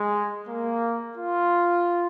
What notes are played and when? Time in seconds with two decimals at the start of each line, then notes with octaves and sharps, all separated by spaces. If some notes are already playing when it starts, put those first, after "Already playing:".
Already playing: G#3
0.48 A#3
1.18 F4